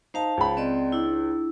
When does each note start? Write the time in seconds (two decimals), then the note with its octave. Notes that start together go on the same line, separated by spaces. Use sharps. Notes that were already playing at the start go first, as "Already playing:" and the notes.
0.14 D#4 C5 F5 A5
0.37 C#2 B5
0.57 C4 D5 D#5
0.92 D4 E4